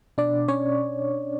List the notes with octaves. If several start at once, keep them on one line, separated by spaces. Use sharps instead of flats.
B2 D4 D5
C#4 C#5